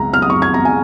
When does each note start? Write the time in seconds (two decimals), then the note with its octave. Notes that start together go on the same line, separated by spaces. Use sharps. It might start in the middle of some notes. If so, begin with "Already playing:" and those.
Already playing: C#2 A#5
0.13 F6
0.22 D#6
0.30 C#6
0.42 G#6
0.54 A#5
0.65 G#5